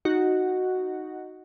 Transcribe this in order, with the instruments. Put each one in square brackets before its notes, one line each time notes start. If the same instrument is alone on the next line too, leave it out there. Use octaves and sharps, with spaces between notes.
[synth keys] D#4 F#4